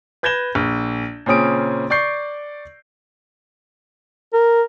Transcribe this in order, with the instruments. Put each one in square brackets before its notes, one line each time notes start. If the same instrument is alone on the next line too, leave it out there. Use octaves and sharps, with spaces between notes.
[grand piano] B4 G6 G#6 A#6 E7 G7
A#1
A#2 C#3 C4 C#4 D#6 D7
D5 C#6 G6 C7
[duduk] A#4